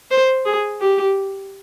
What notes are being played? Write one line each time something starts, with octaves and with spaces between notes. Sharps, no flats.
C5
G#4
G4